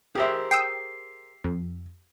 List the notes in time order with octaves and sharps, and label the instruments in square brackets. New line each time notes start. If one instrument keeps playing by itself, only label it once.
[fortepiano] G4 E5 [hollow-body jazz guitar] G#4 A#4 C5
[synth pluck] G5 D#6 E6 [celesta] C7
[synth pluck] F2